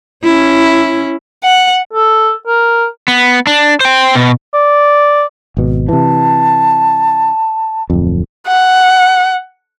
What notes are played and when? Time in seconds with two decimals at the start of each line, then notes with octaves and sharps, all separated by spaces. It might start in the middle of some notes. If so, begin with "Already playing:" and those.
0.24 C#4 E4
1.44 F#5
1.93 A4
2.47 A#4
3.08 B3
3.47 D4
3.80 C5 G5
4.15 B2
4.54 D5
5.57 G#1 B2
5.89 C3 E3 A5
7.90 D1 F2
8.47 F#5